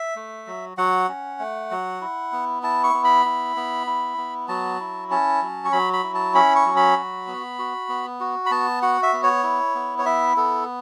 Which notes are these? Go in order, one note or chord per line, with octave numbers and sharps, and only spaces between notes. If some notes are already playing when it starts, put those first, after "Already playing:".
Already playing: E5
A3
F#3
F#3 F#5
C#4
A3
F#3
E4
B3
E4 A5
C#6
B3
B5
E4
B3
E4
B3
F#3 A5
E4
C#4 A5
F#3
C#6
F#3 B5
B5
E4
A5
C#4 B5
C#6
F#3
B5
F#4
B3
F#4
B3
F#4
B5
B3 A5
F#4 F#5
E5
B3
C#5
E4
B3
C#5
E4 E5
B3 A4